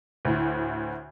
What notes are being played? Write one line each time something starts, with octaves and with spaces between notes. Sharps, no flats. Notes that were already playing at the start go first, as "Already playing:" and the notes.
D2 A2